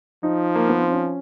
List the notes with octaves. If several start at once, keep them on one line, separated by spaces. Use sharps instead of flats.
F3 D#4
A#3
B3
C4
C#4